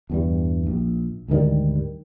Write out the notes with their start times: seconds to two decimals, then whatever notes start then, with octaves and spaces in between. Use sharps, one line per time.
0.10 E2 G2 G3
0.67 A#1
1.28 D2 G#2 D#3 G3